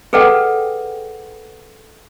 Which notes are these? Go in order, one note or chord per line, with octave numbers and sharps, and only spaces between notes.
G#4 A4 B4 D5 F#5 G5